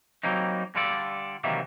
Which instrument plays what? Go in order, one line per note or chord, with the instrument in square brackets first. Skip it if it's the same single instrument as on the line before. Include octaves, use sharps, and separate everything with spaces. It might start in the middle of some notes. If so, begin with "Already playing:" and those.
[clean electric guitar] F#3 G3 A#3 C4 D#4
D3 G3 F4 A4 D5
C3 D#3 E3 F#3 G3 A#3